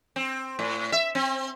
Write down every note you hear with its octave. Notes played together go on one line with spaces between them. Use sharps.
C4
A2
E5
C4